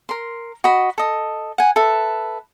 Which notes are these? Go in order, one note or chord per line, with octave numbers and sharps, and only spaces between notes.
A#4 C6
F#4 D#5 B5
A4 D#5
F#5 G#5
A4 B4 E5